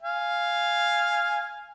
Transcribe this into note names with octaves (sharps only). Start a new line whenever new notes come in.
F5 G#5